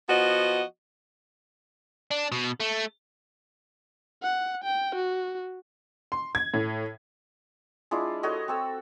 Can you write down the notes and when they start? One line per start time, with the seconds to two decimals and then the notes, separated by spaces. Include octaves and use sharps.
0.09 F3 B3 F#4 D#5
2.11 D4
2.32 B2
2.60 A3
4.23 F#5
4.64 G5
4.95 F#4
6.12 C6
6.35 G#6
6.54 A2
7.91 G#3 D4 E4 F4
8.23 F#4 A4 C#5 D#5
8.48 C4 A4 E6